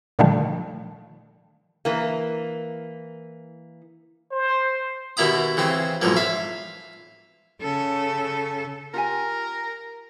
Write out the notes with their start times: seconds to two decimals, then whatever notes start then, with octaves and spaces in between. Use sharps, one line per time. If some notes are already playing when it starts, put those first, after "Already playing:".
0.19 A#2 D3 D#3 F3 G3 A3
1.85 E3 A#3
4.32 C5
5.17 D#2 B2 A#3 E4 A#5 D#6
5.57 C#3 E3 C4
6.02 B1 E2 G#2 F3 A#3
6.16 E5 F5
7.62 C#3 A4
8.94 F4 G4 A#4 G#5